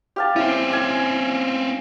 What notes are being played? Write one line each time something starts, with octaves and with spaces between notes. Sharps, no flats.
G4 F5 A5
C4 C#4 E4
G#5